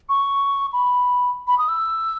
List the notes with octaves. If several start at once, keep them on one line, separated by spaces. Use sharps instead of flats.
C#6
B5
B5
D#6
E6